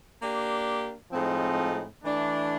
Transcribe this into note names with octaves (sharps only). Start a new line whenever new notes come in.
A#3 D4 G4
A2 F3 G#3 C4 D#4
E3 A3 D4